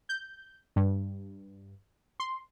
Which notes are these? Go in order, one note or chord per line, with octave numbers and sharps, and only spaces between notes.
G6
G2
C6